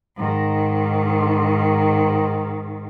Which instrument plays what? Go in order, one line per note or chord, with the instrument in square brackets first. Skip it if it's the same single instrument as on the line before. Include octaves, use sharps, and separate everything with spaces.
[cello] G#2 D#3